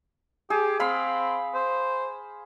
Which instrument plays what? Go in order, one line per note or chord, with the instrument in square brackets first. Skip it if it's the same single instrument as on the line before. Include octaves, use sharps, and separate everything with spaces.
[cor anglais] G4 [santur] G#4
[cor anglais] C4 [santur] F5 B5
[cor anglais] C5